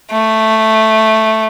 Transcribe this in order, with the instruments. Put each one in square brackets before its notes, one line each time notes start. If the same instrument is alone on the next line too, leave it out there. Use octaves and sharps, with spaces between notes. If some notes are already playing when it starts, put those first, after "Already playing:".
[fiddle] A3